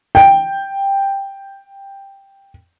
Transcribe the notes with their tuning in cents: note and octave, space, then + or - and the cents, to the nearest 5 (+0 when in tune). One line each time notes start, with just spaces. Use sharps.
G5 +5